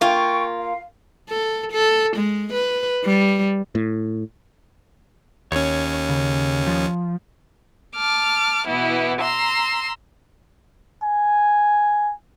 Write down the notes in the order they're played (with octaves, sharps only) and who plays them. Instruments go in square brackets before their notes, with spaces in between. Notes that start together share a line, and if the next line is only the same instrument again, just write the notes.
[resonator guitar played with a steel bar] A#3 F4 [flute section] G5 C#6
[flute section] F5
[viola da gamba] A4
A4
G#3
B4
G3
[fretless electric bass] A2
[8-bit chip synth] D#2 C#4 [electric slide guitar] C#5
[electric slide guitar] C#3
F3
[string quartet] A5 D6 F6
B2 E3 B3 E4
A#5 C6 E6
[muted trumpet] G#5